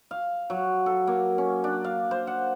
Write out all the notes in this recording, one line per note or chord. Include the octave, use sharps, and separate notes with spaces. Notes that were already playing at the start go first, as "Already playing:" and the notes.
F5
F#3
A4
A#3
C#4
D4
F5
C5
F#5